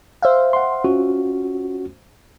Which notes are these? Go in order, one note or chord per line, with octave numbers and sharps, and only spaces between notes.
C5 E5 F5
F#5 C6
C#4 F4 F#4